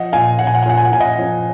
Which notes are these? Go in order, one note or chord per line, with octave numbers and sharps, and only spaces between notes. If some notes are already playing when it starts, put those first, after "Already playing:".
Already playing: F3 D#5 F#5
A#2 F5 G#5
A#2 F#5
G#5
F#5
G#5
A#2 F#5
G#5
F#5
A#2 G#5
D#5 F#5
F3